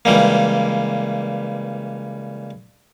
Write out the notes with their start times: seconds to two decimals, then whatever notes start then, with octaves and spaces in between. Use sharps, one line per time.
0.05 C#2 E3 G3 A#3